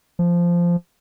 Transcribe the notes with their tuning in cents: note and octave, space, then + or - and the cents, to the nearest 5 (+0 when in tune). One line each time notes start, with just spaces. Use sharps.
F3 -10